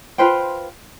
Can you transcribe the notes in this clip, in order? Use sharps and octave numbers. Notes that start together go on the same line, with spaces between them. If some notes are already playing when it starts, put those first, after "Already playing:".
F4 B4 C5 G5